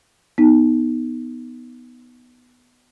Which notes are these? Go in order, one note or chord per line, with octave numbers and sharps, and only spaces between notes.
B3 D#4